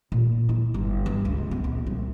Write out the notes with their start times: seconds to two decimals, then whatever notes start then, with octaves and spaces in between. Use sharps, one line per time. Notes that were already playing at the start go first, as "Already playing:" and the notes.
0.12 A#2
0.49 E4
0.74 G1
1.06 G2
1.25 C#2
1.51 B3
1.64 A#1
1.87 C2